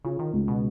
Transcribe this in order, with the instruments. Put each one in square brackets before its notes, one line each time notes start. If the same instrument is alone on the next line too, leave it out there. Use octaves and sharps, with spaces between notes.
[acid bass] C#3 [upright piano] F4
[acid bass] D#3
[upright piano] C#2
[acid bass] B2